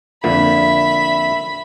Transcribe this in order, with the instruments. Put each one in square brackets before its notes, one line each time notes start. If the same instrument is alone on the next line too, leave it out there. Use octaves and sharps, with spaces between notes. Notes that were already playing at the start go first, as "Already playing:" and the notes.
[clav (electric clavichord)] F2 A#2 D3 [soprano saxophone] E5 [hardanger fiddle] B5